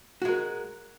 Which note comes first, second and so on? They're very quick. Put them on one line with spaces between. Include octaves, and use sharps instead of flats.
F#4 G#3 A#4